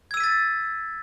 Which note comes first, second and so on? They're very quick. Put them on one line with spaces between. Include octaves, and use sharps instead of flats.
G#6 E6 D#7 B6 A6